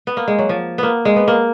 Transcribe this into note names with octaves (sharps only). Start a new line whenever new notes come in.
B3
A#3
G#3
F#3
F3
A#3 B3
G#3
B3
A#3